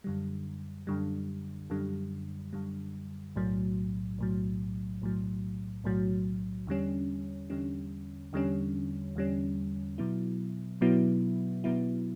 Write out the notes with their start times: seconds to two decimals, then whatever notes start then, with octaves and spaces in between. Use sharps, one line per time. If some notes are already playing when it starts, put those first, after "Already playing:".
0.04 F#2 D3 G3
0.87 F#2 D3 G3
1.70 F#2 D3 G3
2.53 F#2 D3 G3
3.36 B1 A2 F#3
4.18 B1 A2 F#3
5.01 B1 A2 F#3
5.84 B1 A2 F#3
6.67 E2 D3 G3 C#4
7.50 E2 D3 G3 C#4
8.33 E2 D3 G3 C#4
9.15 E2 D3 G3 C#4
9.98 B2 F#3 B3 E4
10.81 B2 F#3 B3 E4
11.64 B2 F#3 B3 E4